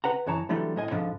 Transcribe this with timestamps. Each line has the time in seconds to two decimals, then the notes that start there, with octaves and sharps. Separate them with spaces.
0.04 B4 F#5 A#5
0.26 F#2 E3 C#5 A5 A#5
0.49 D3 E3 F#3 G3 A3
0.76 A2 D#5 G#5
0.91 C#2 G#2 D3 F3